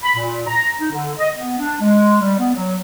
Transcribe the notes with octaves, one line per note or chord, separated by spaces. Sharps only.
B5
A#2
A#5
D#4
D3
D#5
B3
D4
G#3
G3
B3
F#3